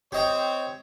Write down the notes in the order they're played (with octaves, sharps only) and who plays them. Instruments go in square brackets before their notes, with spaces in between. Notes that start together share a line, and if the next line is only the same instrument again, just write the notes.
[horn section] C4 C#5 [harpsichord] G4 D#5 G5